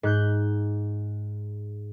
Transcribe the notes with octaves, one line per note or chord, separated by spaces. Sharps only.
G#2 F#6 G6